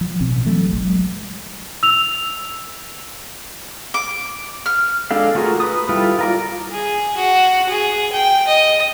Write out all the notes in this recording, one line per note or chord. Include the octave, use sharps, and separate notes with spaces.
F3
A1 B2 C4
E3 F#3 G3 A3
F#1 B1
F#3 G#3
E6 F7
D6
F6
G#3 D4 A4 F5
A3 F4 F#4 G#4 A#4
B4 D#6
G3 E4 F4 A4
F4 A#4 D5
G#4
F#4
G#4
G5
D#5